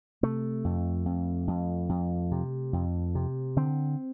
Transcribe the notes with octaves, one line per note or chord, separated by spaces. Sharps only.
C3 A3
F2
F2
F2
F2
C3
F2
C3
D3 C4